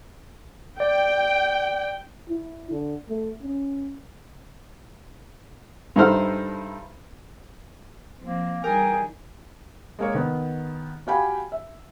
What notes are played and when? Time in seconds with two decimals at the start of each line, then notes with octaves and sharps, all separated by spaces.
0.80 D5 G5
2.29 E4
2.71 D3
3.09 A3
3.43 C#4
5.96 G2 D#4 E4 A4 C5 F6
8.23 F3 A#3 C4
8.64 E3 G3 D#4 G#4 A#4 G5
9.99 G#3 A#3 C#5
10.14 D#3 B3
11.07 F#4 G4 F5 G5 G#5 B5
11.52 E5